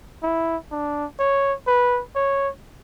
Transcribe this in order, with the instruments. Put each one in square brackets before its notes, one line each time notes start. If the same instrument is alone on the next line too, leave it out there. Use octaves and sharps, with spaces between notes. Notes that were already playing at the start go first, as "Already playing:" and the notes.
[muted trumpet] E4
D4
C#5
B4
C#5